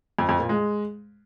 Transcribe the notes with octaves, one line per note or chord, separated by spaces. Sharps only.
F2
F2
A#2
G#3